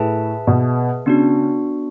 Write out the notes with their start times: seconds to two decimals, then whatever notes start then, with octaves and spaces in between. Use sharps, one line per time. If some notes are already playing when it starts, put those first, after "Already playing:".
Already playing: A2 G#4 B4 E5 A5
0.47 B2
1.06 C#3 B3 D4 F#4